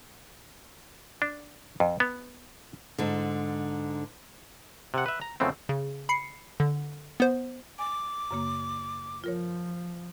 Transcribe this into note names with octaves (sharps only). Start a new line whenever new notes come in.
D4
F2
B3
G#2 D3
C3 F#5
B4 E5
A#5
F2 C#3 E3 A3 B3 C4
C#3
B5 C7 C#7
D3
B3 C5
G#5 D6
F#2 C#3 A#3
F3 F4 A#4 C#5